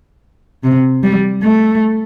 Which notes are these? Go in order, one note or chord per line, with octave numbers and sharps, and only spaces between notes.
C3
G3
A3